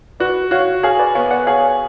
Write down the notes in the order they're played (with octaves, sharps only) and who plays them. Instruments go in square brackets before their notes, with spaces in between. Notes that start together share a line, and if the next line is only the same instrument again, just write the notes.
[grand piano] F#4 [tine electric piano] B4 D5
[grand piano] F#4 [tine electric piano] C#5 F5
[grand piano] G#4 [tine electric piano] C#5 F5
[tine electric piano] B4 D5
[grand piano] B3 [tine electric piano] C#5 F5
[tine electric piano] D5 F#5
[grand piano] G#4 [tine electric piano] C#5 F5